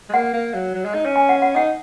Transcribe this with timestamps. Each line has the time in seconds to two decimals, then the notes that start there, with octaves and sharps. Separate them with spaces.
0.09 G#3
0.13 A#3 F#5
0.33 A#3
0.54 F#3
0.74 F#3
0.85 G#3
0.95 D#4
1.05 C#4
1.16 G#5
1.29 F#5
1.42 F#5
1.55 D#4 F#5